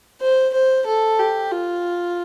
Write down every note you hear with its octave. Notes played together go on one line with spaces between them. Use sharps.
C5
C5
A4
G4
F4